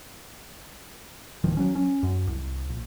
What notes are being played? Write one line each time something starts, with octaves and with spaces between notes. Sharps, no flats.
D1 D#3 F3
F#3 C#4
C#4
F#2
C2
A#1